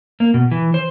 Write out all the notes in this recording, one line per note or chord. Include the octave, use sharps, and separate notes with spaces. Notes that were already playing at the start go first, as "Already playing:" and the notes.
A#3
B2
E3
C5